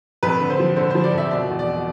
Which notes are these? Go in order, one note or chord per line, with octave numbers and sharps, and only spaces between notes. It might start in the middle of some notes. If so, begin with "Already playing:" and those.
F2 B4
D3
C5
F3
D3 C5
F3 C5
D5
F2 E5
B2 D5
E2
D5
B2